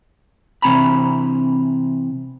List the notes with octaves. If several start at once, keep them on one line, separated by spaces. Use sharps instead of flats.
C3 E3 C4 G#5 A#5 B5